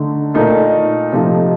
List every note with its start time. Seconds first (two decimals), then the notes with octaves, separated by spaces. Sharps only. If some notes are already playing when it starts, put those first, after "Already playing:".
Already playing: D3 A3 D#4
0.34 A#2 A3 D#4 A#4
1.13 C3 F3 A3 D#4